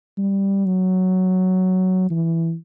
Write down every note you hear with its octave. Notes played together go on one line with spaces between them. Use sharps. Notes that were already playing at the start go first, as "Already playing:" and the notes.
G3
F#3
E3